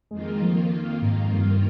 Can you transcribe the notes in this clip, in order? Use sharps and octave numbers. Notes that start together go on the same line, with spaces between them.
F2 D#3 G#3 A#3 F4
F3
G#2
G2